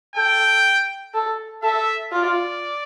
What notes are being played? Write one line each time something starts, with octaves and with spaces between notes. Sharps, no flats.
A4 G5
A4
A4 E5
F4 D5